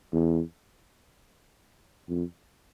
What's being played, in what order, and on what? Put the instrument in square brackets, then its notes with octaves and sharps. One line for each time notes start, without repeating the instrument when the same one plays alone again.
[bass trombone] E2
F2